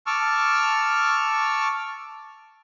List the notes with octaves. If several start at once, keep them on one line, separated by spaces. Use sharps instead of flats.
A5 C#6 D6 E6 F6